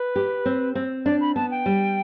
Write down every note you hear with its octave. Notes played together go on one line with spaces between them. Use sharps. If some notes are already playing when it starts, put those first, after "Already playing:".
Already playing: B4
G4
C4
C4
D4 D5
B5
B3 A5
G5
G3